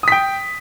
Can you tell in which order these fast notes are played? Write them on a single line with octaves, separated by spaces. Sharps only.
D#6 B6 G5